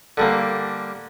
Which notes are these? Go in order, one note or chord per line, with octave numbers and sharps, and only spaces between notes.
D3 G3 A#3